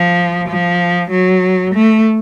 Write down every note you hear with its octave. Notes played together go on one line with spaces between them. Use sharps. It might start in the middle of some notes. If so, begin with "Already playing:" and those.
Already playing: F3
F3
F#3
A3